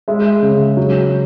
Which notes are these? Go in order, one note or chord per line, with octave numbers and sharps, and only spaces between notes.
G#3 E5
C#3
F#3